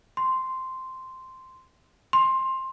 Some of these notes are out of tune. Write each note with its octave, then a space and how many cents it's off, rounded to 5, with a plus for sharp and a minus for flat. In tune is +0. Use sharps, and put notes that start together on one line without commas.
C6 -5
C6 +15